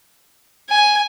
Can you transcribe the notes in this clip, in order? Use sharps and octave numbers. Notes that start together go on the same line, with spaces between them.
G#5